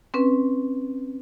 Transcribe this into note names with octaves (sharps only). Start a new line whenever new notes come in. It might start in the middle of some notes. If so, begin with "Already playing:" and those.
C4 C#4 B4